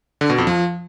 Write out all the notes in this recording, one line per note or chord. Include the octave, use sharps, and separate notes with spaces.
D3
B2
F2
F3